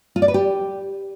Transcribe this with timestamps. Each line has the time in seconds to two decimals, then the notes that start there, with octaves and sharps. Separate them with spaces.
0.16 F4
0.22 D5
0.28 B4
0.34 G4